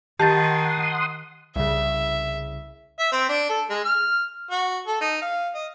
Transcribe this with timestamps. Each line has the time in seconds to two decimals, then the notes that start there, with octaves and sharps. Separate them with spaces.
0.20 D#3 G4 F#5 A5 C6 D#6 G6 A6
1.56 C2 C#3 E5
2.99 E5
3.12 C4
3.29 D4
3.49 A4
3.70 G#3
3.84 F6
4.51 F#4
4.87 A4
5.01 D#4
5.22 F5
5.54 D#5